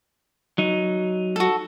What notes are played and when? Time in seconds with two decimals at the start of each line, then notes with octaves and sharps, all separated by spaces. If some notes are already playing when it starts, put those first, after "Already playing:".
0.58 F#3 D#4
1.36 F#4 A4